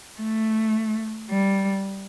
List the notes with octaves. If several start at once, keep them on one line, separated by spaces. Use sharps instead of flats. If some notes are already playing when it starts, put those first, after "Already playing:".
A3
G3